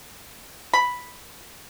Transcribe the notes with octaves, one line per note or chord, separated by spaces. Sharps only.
B5